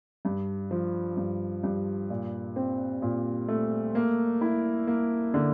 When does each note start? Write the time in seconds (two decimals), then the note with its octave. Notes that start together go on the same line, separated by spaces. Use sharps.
0.25 G2
0.71 F3
1.17 G2
1.63 G2
2.10 A#2
2.56 C4
3.02 A#2
3.48 A3
3.95 A#3
4.41 E4
4.87 A#3
5.34 D3